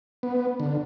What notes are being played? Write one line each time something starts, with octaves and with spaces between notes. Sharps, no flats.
B3
D3